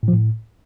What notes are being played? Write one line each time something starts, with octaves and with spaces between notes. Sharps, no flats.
A2
F3
A2